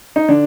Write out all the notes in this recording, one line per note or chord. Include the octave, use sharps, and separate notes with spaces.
D#4
D3 D4